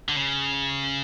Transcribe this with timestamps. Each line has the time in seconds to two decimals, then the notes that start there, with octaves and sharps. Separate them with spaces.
0.09 D3
0.16 C#3